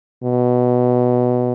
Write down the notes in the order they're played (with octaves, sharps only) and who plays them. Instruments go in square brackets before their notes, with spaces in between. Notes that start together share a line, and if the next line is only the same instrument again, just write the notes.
[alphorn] B2